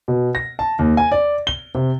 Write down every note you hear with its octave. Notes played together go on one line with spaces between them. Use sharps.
B2
A#6
A5
D#2
G#5
D5
G7
C3